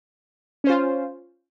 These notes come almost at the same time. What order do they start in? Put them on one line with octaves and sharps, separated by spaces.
C#4 C5 F4